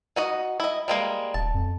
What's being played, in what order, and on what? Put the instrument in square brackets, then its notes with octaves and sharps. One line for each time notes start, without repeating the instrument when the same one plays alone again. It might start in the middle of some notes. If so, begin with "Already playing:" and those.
[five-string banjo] D#4 F#4 D#5
E4 D#5
G3 G#3 A#3
[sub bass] D#1 [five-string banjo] A5
[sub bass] F2